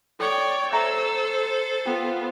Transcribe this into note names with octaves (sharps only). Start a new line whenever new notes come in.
A4 C#5 D5 G5
A4 C5 C#5 E5 A#5 E6
B3 F4 G5